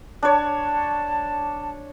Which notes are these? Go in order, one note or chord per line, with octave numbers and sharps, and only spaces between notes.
D4 C#5 A5